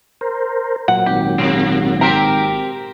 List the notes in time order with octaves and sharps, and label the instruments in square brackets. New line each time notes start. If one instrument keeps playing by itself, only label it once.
[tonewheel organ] A#4 C5
[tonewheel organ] A#2 F#3 [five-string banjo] F#5
[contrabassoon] G#1 [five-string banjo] G4
[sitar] C3
[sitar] C4 G4 A#4 [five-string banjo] A#5